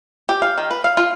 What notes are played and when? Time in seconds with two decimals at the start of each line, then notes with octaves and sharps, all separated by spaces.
0.29 G4
0.42 F5
0.58 D#3
0.71 B4
0.84 F5
0.97 F4